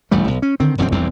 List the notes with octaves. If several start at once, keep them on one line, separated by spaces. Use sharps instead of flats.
E1 A1 G3 A3
B1
C#4
D3 D#3 C4
E1 F#2 F#3 C4
E1 C2 F2 C4